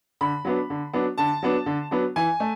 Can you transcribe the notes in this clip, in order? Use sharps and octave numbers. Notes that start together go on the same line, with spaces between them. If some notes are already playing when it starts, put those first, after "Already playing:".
D3 B5
F#3 B3 D4
D3
F#3 B3 D4
D3 A5
F#3 B3 D4
D3
F#3 B3 D4
E3 G#5
A3